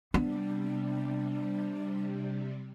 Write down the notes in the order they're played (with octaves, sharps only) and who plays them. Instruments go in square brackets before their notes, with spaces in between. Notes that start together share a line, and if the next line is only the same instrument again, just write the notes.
[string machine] C3 G3 [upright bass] B3 [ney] D4